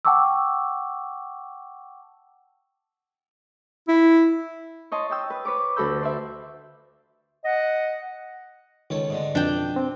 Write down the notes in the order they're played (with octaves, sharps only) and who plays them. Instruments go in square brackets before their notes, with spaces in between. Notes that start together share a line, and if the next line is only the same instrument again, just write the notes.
[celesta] F#5 G5 A5 C#6 D6 E6
[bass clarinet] E4
[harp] C#5 D#5 A5 C6
D#5 G5 E6
B4
B4 C#5 D6
D2 F#4 A4 B5 E6 G6
C5 D5 E5
[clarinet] D#5 [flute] F#5
[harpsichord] C#2 A4 C#5 [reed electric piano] D#3
[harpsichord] G#2 D3 G#3
[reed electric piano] F2 [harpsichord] B2 [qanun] D4 G5
[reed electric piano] C4